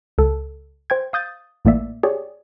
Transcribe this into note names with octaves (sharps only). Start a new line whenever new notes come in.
C#2 A4
C5 G5 G#6
F5 D#6 G6 A6
A1 A2 A#3 D5 E5
G4 G#4 C#5 D5